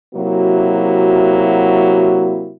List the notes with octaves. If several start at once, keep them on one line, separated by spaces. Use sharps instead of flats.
C3 F#3 A#3 E4 F#4